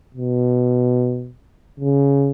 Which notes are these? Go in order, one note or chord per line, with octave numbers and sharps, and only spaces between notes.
B2
C#3